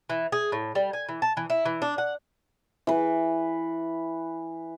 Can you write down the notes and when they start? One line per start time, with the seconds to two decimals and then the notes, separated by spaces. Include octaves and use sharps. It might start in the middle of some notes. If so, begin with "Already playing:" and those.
0.10 E3
0.32 G#4
0.52 A2
0.75 G3
0.93 G#5
1.09 E3
1.22 A5
1.37 E3
1.50 E4
1.65 E3
1.82 D4
1.98 F#5
2.87 E3 B4